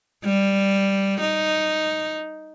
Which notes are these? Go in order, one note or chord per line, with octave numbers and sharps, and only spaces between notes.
G3
D#4